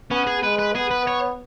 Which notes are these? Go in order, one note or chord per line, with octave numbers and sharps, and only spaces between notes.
B3 C#4
G#4
G#3 B4
B4
B3 G#4
B4
C#5